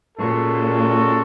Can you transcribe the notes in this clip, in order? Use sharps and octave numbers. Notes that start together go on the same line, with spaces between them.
A#2 G#3 C#4 F#4 A4